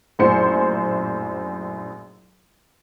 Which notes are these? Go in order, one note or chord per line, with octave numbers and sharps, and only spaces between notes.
A#1 F#2 A2 C5 C6 C#7